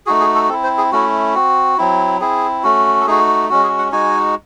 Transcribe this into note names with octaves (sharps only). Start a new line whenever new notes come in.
A3 D#4 F#4 G#4
G#4
A4
C4 E4 A4
C5
G#4
A3 C#4 E4 F#4
C4 F#4
F#3 C4 E4
C4 E4 G#4
A3 C#4 F#4
A4
A3 D#4 F#4 G#4
G#3 C#4 F#4
G#4
F#5
G#3 D#4 F#4 G#5